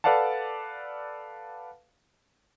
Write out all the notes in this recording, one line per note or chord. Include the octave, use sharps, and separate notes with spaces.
A4 B4 D5 F5 F#5 A5